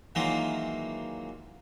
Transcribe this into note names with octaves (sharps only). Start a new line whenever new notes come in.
D#3 E3 F#3 G#3 A#3 F4